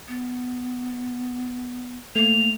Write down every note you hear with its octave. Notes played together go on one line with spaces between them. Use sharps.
B3
A3 A#3 F7